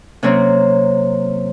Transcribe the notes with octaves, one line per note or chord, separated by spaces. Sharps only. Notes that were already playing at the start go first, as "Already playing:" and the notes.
C3 F#3 A#3 C4 C#4